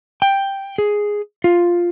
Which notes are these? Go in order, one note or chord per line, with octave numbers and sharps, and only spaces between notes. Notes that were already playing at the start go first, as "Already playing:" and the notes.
G5
G#4
F4